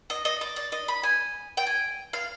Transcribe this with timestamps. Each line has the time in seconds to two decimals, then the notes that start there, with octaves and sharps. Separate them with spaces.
0.10 D#5
0.25 D#5
0.41 D5
0.56 D5
0.72 D#5
0.88 B5
1.03 G#5
1.57 G5
1.67 G#5
2.13 F5